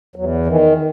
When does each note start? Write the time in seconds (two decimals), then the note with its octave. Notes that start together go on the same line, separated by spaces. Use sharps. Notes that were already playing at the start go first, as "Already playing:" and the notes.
0.16 E2 F#3
0.46 D#3 E3